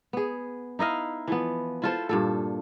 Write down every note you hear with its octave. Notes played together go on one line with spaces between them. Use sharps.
B3 G#4
D#4 E4 D#5 F5
E3 F3 B3
E4 F4 A4 C5
G2 A#2 A4